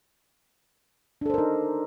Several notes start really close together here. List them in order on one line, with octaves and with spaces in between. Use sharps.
D4 A4 C5 A#4 D#4